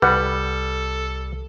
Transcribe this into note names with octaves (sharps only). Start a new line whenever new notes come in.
C2 G3 A4 B4 F#5